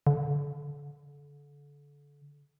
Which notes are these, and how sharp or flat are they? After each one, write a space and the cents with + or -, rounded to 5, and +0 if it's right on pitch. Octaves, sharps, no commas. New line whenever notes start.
D3 -30